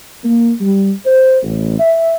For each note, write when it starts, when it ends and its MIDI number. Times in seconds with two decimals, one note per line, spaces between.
0.24 0.52 58
0.61 0.91 55
1.06 1.38 72
1.43 1.78 33
1.80 2.16 76